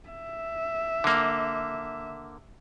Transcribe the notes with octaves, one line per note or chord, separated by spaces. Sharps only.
E5
D3 A#3